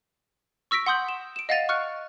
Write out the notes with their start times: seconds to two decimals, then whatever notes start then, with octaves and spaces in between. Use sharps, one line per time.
0.71 C#6 E6 A#6 B6 D7
0.86 F#5 C6 D#6 G6 F#7
1.09 E7
1.36 D7 E7
1.49 D#5 F5 F#5 A6 D#7 F7
1.69 C#6 F6 F#6 C#7